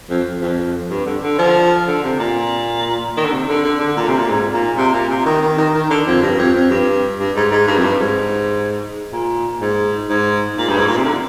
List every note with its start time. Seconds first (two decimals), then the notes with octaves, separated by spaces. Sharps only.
0.10 F2
0.41 F2
0.90 G2
1.06 D3
1.22 D3
1.38 F3
1.87 D3
2.04 C3
2.19 A#2
3.17 D#3
3.25 D3
3.32 C3
3.49 D3
3.64 D3
3.80 D3
3.96 A#2
4.08 C3
4.18 A#2
4.29 G#2
4.53 A#2
4.77 C3
4.93 A#2
5.09 C3
5.26 D#3
5.42 D#3
5.57 D#3
5.74 D#3
5.90 D3
6.07 F2
6.22 G2
6.38 F2
6.55 F2
6.70 G2
7.19 G2
7.35 G#2
7.51 G#2
7.67 G2
7.78 F2
7.83 G2
8.00 G#2
9.12 A#2
9.61 G#2
10.09 G#2
10.58 A#2
10.68 G2
10.77 G#2
10.87 A#2
10.97 C3
11.05 D3